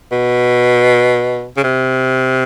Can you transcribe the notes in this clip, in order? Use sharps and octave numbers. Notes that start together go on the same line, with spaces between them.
B2
C#3
C3